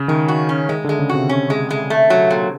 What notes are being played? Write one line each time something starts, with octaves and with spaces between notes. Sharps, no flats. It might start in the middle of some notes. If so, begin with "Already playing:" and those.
Already playing: C#3
D#3 G#3
F#4
C#4
D#3 G#3
D3
G#3
C#3
F#4
C3
C#4
G#3
G#3
A3
F#3
A#2